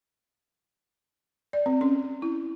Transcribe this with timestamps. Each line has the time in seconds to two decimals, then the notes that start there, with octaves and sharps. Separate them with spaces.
1.53 D5
1.66 C4
1.81 C#4
2.22 E4